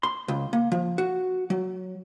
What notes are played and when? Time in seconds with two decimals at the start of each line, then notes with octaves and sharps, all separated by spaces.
0.03 C6
0.28 C#2
0.53 A#3
0.72 F3
0.98 F#4
1.50 F#3